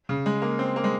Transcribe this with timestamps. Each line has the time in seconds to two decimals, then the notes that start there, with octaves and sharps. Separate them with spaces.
0.09 C#3
0.26 G#3
0.42 A#3
0.59 C4
0.76 A#3
0.84 G#3